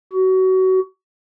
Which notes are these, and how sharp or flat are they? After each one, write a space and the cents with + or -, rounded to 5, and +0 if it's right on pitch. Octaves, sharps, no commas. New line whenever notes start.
F#4 +25